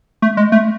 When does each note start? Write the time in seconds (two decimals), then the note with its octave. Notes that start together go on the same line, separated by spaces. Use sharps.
0.22 A3
0.37 G#3
0.52 A3